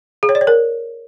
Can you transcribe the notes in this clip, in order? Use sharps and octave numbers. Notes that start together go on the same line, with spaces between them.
G#4
C#5
D5
C#5
A#4